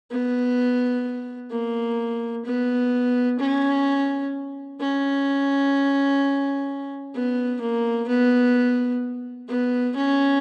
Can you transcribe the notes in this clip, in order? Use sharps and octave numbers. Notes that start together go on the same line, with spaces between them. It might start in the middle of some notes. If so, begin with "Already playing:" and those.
B3
A#3
B3
C#4
C#4
B3
A#3
B3
B3
C#4